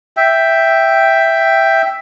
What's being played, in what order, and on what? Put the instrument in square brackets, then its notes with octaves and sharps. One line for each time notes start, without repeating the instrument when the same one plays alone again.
[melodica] E5 G5